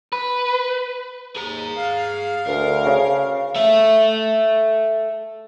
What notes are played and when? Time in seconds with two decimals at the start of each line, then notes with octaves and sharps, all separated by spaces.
0.13 B4
1.37 D#2 G#4 A#5
1.76 F5
2.47 D2 A#4
2.86 C#3
3.56 A4 E5